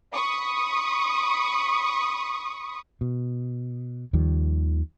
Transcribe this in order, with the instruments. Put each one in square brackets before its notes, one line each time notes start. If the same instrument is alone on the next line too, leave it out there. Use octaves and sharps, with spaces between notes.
[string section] B5 C#6 D#6
[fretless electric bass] B2
D#2 D#3 F3 G3